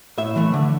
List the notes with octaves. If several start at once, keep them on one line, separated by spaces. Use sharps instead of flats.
A2 E5
E3 A3
D3